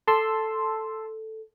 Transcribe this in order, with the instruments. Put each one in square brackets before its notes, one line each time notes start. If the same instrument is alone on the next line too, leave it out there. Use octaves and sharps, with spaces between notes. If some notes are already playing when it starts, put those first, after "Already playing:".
[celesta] A4 [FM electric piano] A5 C6 E6